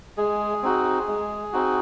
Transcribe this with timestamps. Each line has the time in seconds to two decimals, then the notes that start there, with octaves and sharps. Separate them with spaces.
0.17 G#3 G#4
0.63 C4 D#4 F#4
1.08 G#3
1.53 C4 D#4 F#4